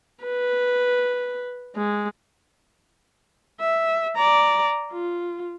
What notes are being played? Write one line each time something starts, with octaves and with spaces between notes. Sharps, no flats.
B4
G#3
E5
D5 A#5
F4